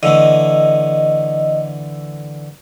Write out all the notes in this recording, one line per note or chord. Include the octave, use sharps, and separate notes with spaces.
D3 E3 A3 D#5